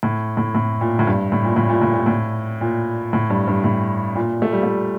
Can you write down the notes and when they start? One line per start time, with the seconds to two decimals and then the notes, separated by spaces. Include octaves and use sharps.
0.03 A2
0.37 A2
0.55 A2
0.81 A#2
0.99 A2
1.07 G2
1.32 A2
1.45 A#2
1.57 A2
1.69 A#2
1.82 A2
1.94 A#2
2.06 A2
2.61 A#2
3.13 A2
3.30 G2
3.47 G2
3.64 A2
4.16 A#2
4.42 A3
4.53 G3
4.63 A3